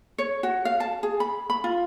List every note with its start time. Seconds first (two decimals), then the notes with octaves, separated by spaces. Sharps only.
0.18 C#5
0.43 F#4
0.65 F5
0.80 A5
1.03 G#4
1.20 B5
1.50 B5
1.64 F4